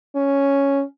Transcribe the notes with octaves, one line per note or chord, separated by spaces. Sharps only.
C#4